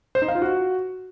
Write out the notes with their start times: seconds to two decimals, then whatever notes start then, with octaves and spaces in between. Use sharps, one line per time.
0.15 C5
0.22 D#4
0.28 F5
0.35 F4
0.42 F#4